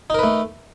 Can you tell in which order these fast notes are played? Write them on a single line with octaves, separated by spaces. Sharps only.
D#4 A#4 B4 A3